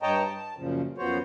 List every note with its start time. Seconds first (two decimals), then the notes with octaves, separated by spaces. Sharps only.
0.03 G2 C#5 D#5 G5 A5 A#5
0.26 A5
0.57 F#2 A#2 C#3 F3
0.98 F#2 F3 B3 F#4 C5 C#5